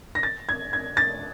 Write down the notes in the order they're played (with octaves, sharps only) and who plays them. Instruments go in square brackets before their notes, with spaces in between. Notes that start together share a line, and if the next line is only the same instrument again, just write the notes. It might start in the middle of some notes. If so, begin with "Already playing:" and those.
[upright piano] A#6
A6
G#6
G#6
A6